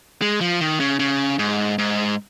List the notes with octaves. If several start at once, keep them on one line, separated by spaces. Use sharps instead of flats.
G#3
F3
D#3
C#3
C#3
G#2
G#2